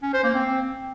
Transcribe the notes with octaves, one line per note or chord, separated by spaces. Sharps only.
C#4
C5
A#3
C4